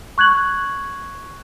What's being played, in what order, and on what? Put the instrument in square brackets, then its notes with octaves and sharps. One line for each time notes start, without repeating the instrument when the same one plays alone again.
[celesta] C#6 F#6 G#6 F#7